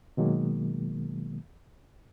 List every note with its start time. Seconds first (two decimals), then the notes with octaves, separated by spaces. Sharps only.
0.17 B2 D#3 F#3 G#3 A#3